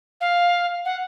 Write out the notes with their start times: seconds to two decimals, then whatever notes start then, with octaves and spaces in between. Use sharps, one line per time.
0.21 F5
0.85 F#5